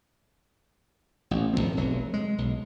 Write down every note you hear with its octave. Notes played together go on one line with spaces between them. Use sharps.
A1
G#1 F2 F3 C4
F1 B1 F#3
G#3
B1